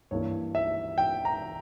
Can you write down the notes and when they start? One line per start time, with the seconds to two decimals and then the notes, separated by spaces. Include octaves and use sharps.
0.11 G2 E3 A#3 C#5
0.55 E5
0.98 G5
1.25 A#5